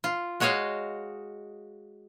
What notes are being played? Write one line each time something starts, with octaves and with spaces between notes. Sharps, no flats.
F4
G#3 F#4 C#5 D#5 F5